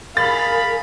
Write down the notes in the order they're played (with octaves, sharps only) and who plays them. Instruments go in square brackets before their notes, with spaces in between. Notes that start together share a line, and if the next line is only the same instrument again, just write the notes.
[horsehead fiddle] G#4 A#4 [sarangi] F5 [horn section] B5 [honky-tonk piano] A6